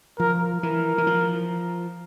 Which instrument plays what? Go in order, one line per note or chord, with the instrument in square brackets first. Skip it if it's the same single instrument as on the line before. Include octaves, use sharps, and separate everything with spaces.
[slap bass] F3 [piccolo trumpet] A#4
[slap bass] E3 [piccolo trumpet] A#4
[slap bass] E3
F3